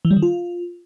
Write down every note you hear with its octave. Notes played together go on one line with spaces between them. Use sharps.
E3
G3
D#3
F4